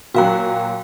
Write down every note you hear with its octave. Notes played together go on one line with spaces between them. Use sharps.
A#2 F#3 F#4 F5 G5